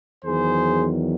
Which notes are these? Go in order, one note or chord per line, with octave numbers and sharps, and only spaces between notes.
E2 D#3 F#3 G#4 C5